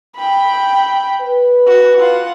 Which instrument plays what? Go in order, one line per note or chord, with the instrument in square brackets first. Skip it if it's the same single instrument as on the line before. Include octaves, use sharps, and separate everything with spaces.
[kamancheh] G5 B5
[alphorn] B4
[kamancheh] F#4
F4 F#5